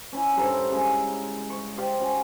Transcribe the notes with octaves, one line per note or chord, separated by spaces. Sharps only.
C#4 E4
G2 A4 C5 A#5
C#3 G#3
C#6
G4 C5 D5 F5
C#4 F#4